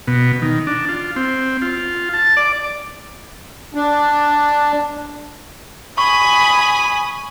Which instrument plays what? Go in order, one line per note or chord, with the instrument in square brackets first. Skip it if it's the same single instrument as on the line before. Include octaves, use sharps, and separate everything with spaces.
[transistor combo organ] B2
D#3
D4
F4
C4
F4
A5
D5
[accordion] D4
[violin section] G#5 D#6 [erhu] B5 [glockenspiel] C#6